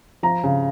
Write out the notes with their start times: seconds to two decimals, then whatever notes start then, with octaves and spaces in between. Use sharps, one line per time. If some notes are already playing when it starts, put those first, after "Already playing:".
0.23 F3 A#5
0.44 C#3